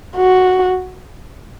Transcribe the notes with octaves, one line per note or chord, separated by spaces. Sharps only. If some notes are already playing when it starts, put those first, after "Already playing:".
F#4